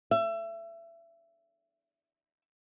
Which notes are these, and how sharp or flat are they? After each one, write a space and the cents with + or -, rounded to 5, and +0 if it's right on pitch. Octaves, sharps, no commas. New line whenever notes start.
E5 +25